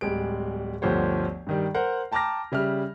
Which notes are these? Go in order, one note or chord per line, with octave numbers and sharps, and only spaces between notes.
D1 G3 G#3 D7
G1 D2 F3 G4 C5 C#5
G2 D#3 G3
A#4 C5 F#5
G5 A5 A#5 D6 F6 A#6
C#3 G3 E5 F6